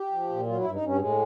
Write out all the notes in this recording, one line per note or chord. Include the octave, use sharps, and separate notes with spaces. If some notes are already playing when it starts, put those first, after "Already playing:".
Already playing: G4
F3
A#2
F#3 F4
E4
G2
D#4
G2 C#4
A2 G#3